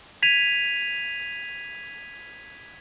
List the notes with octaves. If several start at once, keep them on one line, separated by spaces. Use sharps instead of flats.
G#6 B6 D#7 F7